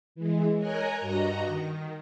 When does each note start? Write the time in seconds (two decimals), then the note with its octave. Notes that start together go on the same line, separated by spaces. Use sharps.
0.15 E3 G#3
0.59 A#4 C#5 D#5 G#5 A#5 F#6
0.99 G2 F#4 D#5 A#5 A#6
1.48 D#3